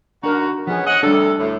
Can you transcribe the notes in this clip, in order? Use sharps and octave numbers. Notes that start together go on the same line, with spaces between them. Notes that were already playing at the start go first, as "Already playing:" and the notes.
D3 D4 D#4 F#4 A#4
F3 G#3 B3 C#4 G#4
C#5 D#5 F#5
D2 C3 G3 D4 A4
D2 A2